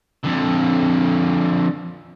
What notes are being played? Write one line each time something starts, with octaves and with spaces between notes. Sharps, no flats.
F2 D3